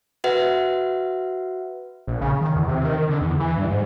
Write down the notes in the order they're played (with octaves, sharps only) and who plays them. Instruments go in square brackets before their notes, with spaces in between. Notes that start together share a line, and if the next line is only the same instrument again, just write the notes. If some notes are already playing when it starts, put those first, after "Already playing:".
[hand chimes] F#4 B4 E5 F#5
[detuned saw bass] A#1
C#3
D#3
E2
C3
D#3
D#3
D3
E2
E3
G2
G#2